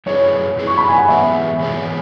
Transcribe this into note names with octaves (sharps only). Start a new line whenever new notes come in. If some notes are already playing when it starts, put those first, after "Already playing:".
F#2 F#3 E4 G#4 B4 C#5
F#2 F#3 E4 G#4 B4
C#6
B5
G#5
F#5
G#2 E3 B3 G#4 B4 E5
G#2 E3 B3 G#4 B4